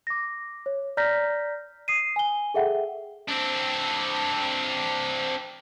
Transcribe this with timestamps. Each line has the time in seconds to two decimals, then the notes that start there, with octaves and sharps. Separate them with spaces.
0.07 D6 A#6
0.66 C#5
0.97 D5 A#5 F6 G6 A#6 B6
1.88 D#6 C7 D#7
2.16 G#5 G7
2.54 G#4 A4 E5 F#5 G5
3.29 C4 D4